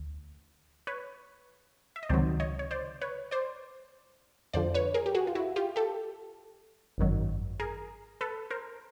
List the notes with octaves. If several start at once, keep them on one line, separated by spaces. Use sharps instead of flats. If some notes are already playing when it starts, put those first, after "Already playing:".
Already playing: D2
B4 C#5
E5
D#5
C#2 C3 D#3 F#3 C5 D5
C#5 D#5
C#5
C5 D5
B4 C#5
C5 D5
F2 D3 F3 C5 D5
B4 C#5
G#4 A#4
G4
F#4 G#4
F4
E4 F#4
F4 G4
G4 A4
G#1 F#2 D#3 F#3
G#4 A#4
A4 B4
A#4 C5